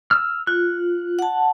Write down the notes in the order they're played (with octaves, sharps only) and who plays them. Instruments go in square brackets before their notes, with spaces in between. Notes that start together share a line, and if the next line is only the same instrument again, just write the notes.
[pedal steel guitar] E6 F6
[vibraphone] F4 [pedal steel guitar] F#6
[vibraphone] F#5 A5